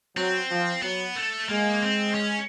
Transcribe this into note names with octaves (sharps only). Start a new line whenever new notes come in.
F#3 C4
F3
F#3 B3
A3
G#3 A#3
C4
C#4